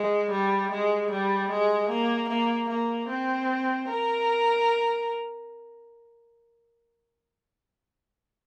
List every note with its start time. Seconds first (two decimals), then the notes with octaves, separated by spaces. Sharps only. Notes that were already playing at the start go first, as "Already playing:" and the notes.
Already playing: G#3
0.30 G3
0.71 G#3
1.11 G3
1.50 G#3
1.89 A#3
2.29 A#3
2.69 A#3
3.09 C4
3.89 A#4